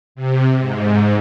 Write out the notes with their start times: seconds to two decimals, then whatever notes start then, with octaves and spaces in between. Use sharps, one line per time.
0.15 C3
0.59 G#2